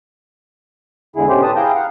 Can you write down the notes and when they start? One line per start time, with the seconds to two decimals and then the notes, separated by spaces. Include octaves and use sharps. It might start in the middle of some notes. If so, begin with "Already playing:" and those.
1.16 E2 G#2 D3 E4 G#4
1.29 B2 D3 C#4 G4 C5
1.42 A2 B4 A5 D#6
1.56 E4 G#4 F5 G5 A#5 G6
1.75 F5 F#5